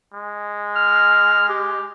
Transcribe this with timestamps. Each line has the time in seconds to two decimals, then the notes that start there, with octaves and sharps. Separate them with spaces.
0.14 G#3
0.76 F6
1.49 G4